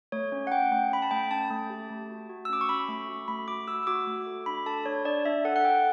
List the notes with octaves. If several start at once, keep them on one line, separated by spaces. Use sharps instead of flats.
A3 C#5
C#4
F#5
C#4 G5
A3 G5
C#4 B5
A5
A3 G5
C#4 A5
A3
G4
A3
F#4
F#4
E6
C#4 D6
C#6
C#4 B5
A3
F#4
A3 B5
F#4 D6
F#4 E6
E6
F#4 D6
A3
A4
D4 B5
A4 A5
D4 C#5
D4 D5
D4 E5
A4 F#5
F#5
A4 G5